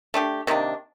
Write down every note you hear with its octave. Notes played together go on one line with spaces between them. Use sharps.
A3 D4 G4
C3 D#3 A#3 D4